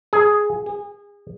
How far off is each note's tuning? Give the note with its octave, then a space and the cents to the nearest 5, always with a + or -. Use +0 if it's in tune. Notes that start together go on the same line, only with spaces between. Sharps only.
G#4 +5
G#4 -30